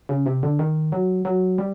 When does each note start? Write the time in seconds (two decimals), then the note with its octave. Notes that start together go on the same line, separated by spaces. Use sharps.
0.09 C#3
0.26 C3
0.43 D3
0.59 D#3
0.92 F#3
1.25 F#3
1.58 G3